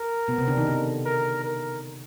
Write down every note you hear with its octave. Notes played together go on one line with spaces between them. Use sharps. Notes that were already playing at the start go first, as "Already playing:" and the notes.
Already playing: A#4
B2 B3
C3 C4
D3 D4
D#3 D#4
D3 D4
A#4
A#4